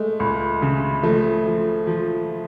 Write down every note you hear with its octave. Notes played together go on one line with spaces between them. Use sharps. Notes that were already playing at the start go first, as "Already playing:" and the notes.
Already playing: G#3 A3
C#2
C#3
F3 A3
F3
F3